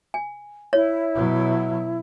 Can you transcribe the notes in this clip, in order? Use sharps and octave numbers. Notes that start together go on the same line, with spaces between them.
G#5
E4 C#5
B2 F#3